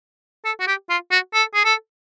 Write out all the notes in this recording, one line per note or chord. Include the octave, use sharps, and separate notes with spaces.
A4
F#4
G4
F4
F#4
A4
G#4
A4